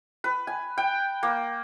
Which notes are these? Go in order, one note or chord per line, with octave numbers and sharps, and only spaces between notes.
B4
G#5
G5
A#3